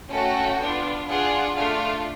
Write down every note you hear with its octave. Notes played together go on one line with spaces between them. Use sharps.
A3 C#4 F#4 A4 G5
B3 D4 F4
D4 F4 G#4 F#5
A3 D4 F4 F5